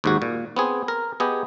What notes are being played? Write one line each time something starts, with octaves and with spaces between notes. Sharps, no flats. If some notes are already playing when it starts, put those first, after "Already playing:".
D#2 G#2 F#4
A#2
B3 C4 G#4
A#4
B3 G4 G#4 D#5